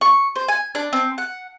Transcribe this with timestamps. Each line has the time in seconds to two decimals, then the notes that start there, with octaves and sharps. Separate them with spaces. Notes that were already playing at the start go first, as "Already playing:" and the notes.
0.01 C#6
0.36 C5
0.48 G#5
0.75 D4
0.93 C4
1.18 F#5